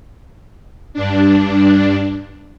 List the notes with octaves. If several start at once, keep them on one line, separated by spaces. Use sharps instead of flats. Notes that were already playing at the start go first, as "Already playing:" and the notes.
G2 D4